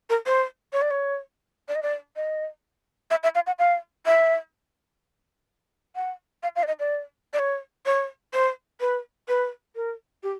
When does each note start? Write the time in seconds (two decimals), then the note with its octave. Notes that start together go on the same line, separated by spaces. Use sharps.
0.10 A#4
0.26 C5
0.73 C#5
0.82 D5
0.91 C#5
1.68 D5
1.75 D#5
1.82 D5
2.16 D#5
3.10 E5
3.23 E5
3.35 F5
3.47 F#5
3.59 F5
4.06 E5
5.96 F#5
6.43 F5
6.56 F5
6.63 D5
6.67 D#5
6.79 D5
7.33 D5
7.39 C#5
7.86 C#5
8.33 C5
8.81 B4
9.28 B4
9.76 A#4
10.23 G4